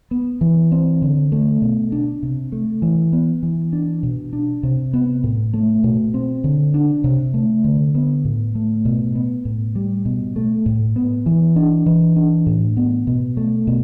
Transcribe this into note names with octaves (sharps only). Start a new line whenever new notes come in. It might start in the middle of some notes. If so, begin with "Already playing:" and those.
B3
E3
C4
D3
A3
B2
D4
C3
A3
E3
B3
E3
D4
B2
D4
C3
B3
A2
A3
B2
C4
D3
D4
C3
A3
D3
B3
A2
A3
B2
B3
A2
G3
B2
A3
A2
B3
E3
D4
E3
D4
A2
B3
B2
A3
B2